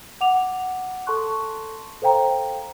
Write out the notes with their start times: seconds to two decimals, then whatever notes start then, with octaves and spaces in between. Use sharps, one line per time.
0.21 F#5 D6 F7
1.07 A4 A5 C6 C#6 F#6
2.02 A4 C5 F5 G5 A#5